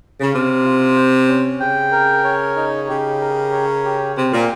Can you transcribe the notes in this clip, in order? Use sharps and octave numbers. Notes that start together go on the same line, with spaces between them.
C#3
C3 F5
F4
C5
C#4
C#3 G5
A#4
C#5
D#4
C#3 G4
A#4
C#5
G4
C3 G4
A#2